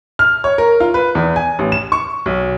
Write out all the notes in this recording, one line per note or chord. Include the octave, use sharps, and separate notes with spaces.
F6
C#5
A#4
F4
B4
E2
G#5
A1
E7
C#6
B1